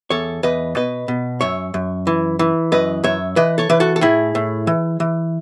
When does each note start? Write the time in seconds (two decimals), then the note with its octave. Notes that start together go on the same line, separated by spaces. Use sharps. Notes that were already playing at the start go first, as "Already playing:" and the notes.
0.10 E2 A4 C#5
0.43 E2 B4 D#5
0.76 B2 B4 D#5
1.08 B2
1.41 F#2 C#5 E5
1.74 F#2
2.07 E3
2.39 E3
2.72 F#2 B4 D#5
3.04 F#2 C#5 E5
3.36 E3 B4 D#5
3.58 A4 C#5
3.70 E3 B4
3.80 F#4 A4
3.96 A4
4.01 A2 E4 G#4
4.35 A2
4.67 E3
5.00 E3